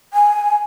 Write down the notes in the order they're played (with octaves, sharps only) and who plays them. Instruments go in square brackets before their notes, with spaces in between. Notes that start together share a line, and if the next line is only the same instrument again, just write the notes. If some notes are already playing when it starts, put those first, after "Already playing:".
[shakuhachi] G#5